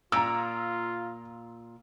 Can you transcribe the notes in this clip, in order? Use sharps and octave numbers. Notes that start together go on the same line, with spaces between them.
A#2 F4 A#5 E6